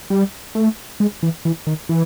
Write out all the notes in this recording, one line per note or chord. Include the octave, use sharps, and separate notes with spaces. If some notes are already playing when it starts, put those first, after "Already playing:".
G3
A3
G#3
E3
E3
D#3
E3